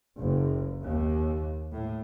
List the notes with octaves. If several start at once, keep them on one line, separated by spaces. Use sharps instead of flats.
F#1
D#2
A2